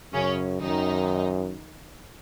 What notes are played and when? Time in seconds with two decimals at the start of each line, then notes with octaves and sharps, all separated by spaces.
0.13 F#2 C#3 C#4
0.61 F#2 D#3 D#4